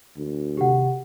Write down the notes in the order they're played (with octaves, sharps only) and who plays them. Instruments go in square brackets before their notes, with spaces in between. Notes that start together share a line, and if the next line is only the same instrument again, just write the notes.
[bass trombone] D2
[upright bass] D#2 C3 [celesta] G4 F#5